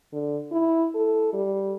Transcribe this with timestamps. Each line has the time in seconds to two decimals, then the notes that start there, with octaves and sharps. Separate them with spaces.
0.13 D3
0.52 E4
0.95 A4
1.33 G3